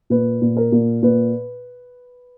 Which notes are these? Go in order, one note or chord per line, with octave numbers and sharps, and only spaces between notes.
A#2 B4
A#2
A#4
A#2
A#2 B4